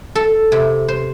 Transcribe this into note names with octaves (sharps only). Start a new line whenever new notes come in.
A4
C3
C5